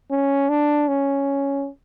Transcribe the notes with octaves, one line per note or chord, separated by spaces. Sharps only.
C#4
D4
C#4